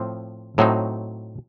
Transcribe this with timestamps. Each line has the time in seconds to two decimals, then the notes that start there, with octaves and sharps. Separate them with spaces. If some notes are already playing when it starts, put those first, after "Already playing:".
Already playing: A2 F3 C4
0.58 A2 F#3 C4 D#4